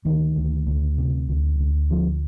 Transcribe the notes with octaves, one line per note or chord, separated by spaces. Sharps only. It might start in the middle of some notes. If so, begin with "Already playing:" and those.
D2 D#3
D2
D2
C3
D2
D2
D3 F3